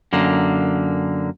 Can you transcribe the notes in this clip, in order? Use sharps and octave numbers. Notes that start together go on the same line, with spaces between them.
F#2 D3 A#3